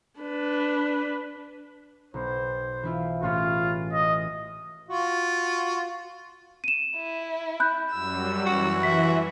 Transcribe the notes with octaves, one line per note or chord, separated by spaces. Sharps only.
D4 B4
B1 C5
E3 E4 F4
A1 F4 G#4 C#5
D#5
F4 F#4
D#7 E7
E4
B5 F#6 G6
F#2 F#3 G3 E6
E3 F#4
E5 B6